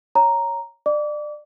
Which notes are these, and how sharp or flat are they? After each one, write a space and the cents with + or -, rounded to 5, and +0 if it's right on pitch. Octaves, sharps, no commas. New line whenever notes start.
C#5 +0 A#5 +0
D5 +25 D6 -30